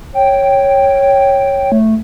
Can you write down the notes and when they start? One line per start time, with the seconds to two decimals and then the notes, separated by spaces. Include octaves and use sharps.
0.14 C#5 G5
1.72 A3